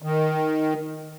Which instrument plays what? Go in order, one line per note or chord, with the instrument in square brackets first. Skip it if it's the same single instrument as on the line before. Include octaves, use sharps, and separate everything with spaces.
[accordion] D#3